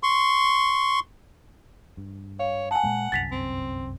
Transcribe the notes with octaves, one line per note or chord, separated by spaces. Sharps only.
C6 C#6
G2
C#5 F5
F#5 G#5 A5
A#2 G#3 A#3
G1 C2 F#2 A6 B6 F7
C4